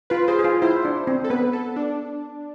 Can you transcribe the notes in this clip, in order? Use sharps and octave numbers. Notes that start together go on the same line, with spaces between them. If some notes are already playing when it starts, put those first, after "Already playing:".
F4 B4
G#4 C5
G#4
F4
E4 C5
D4
C4
A4
B3 B4
A4
D4